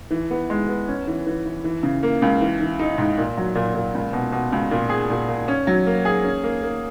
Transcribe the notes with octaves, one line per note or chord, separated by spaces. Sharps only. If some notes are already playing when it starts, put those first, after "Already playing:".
E3
B3
G#3
B3
C#4
E3
E3
E3
E3
C#3
A#3
C#2
E3
E3
D#4
G#2
A#2
F#3
A#2
A#2
C#2
B2
B2
C#2
A#2
G#4
A#2
A#2
C#4
F#3
A#3
G#4
C#4
A#3
A#3